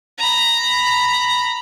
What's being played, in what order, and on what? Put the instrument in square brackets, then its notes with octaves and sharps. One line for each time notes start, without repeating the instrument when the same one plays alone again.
[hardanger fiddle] A#5 B5